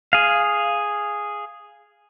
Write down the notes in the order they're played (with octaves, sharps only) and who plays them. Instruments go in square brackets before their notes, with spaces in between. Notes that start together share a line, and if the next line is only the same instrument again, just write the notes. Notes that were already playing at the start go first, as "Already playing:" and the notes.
[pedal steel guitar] G#4 F5